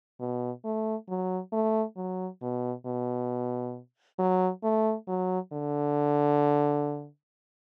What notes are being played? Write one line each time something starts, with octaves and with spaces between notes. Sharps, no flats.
B2
A3
F#3
A3
F#3
B2
B2
F#3
A3
F#3
D3